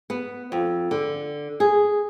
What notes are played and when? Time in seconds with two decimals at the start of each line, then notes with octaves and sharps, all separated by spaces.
0.10 B3
0.52 F2
0.91 D3
1.60 G#4